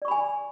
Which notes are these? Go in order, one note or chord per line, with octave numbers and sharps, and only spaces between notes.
D5 G#5 B5 C#6